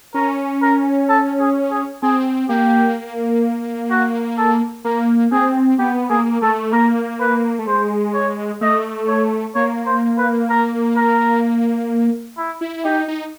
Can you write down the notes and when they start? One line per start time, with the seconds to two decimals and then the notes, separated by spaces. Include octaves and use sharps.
0.14 C#4 A#4
0.61 A#4
1.09 A4
1.39 G#4
1.70 G#4
2.03 C4 G#4
2.49 A#3 G4
3.90 F#4
4.37 A4
4.85 A#3 A#4
5.32 C4 G#4
5.79 B3 G4
6.10 A#3 G#4
6.42 A3 A4
6.72 A#3 A#4
7.20 B4
7.59 A3
7.67 G#3 C5
8.14 C#5
8.61 A3 D#5
9.08 C#5
9.55 A#3 C#5
9.86 C5
10.18 B4
10.49 A#4
10.97 A#4
12.37 E4
12.61 E4
12.85 D#4 G4
13.08 D#4